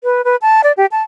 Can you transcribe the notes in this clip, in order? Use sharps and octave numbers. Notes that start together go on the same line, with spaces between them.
B4
B4
A5
D5
G4
A5